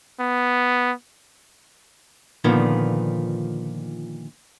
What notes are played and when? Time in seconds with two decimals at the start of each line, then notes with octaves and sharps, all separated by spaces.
0.20 B3
2.44 A#2 D3 D#3 F3 B3